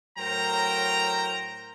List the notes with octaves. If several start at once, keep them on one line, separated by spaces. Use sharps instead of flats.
A2 F#3 A#4 C5 G5 A#5